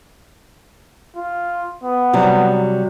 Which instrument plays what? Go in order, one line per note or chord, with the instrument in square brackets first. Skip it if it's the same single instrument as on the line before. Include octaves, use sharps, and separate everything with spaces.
[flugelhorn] F4
B3
[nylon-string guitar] C3 F#3 G3